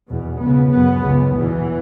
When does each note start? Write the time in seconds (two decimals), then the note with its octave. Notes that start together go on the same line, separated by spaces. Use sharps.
0.09 E2 B2
0.40 C#2 C#3 B3
0.72 F#2 C#3 B3
1.02 C#2 C#3
1.33 E2 B2 E3